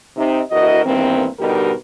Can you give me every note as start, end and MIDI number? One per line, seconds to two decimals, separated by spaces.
0.17 0.41 48
0.17 0.41 63
0.51 0.83 38
0.51 0.83 64
0.51 0.83 66
0.51 0.83 70
0.51 0.83 75
0.85 1.27 40
0.85 1.27 43
0.85 1.27 51
0.85 1.27 58
0.85 1.27 60
1.40 1.72 47
1.40 1.72 50
1.40 1.72 55
1.40 1.72 63
1.40 1.72 67
1.40 1.72 70